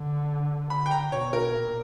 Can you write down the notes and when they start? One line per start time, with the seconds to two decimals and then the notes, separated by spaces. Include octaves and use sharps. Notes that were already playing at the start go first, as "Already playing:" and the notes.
Already playing: D3
0.70 D3 B5
0.86 G5
0.91 A#5
1.12 B2 C#5
1.33 A#4
1.53 A#2